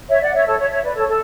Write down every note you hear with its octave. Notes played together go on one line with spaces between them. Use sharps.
C#5 E5
D5 F#5
C#5 E5
A4 C#5
C#5 E5
C#5 E5
B4 D5
A4 C#5
A4